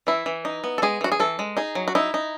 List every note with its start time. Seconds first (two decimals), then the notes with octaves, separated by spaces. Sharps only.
0.07 E3 E4
0.26 E3
0.45 D#4
0.64 B3
0.78 A4
0.82 G#3 G#4
1.01 E3 F#4
1.12 G#4
1.20 E3 A4
1.39 G#3
1.57 D#4 G#4
1.75 F#3
1.88 F#4
1.95 D#4 E4
2.14 D#4